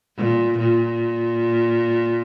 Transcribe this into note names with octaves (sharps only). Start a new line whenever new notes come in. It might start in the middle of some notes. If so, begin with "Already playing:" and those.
A#2
A#2